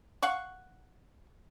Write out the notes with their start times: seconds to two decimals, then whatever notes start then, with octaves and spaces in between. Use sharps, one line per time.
0.23 F5 F#5 C#6